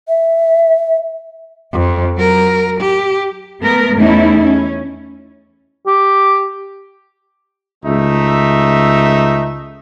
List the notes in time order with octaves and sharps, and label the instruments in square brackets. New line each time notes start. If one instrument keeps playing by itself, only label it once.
[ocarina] E5
[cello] F2
F#3 A#4
G4
[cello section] A3 B3 A#4
E2 A3 C#4 D#4 E4
C#4
[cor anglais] G4
[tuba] C#2 [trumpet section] A3 D#4 E5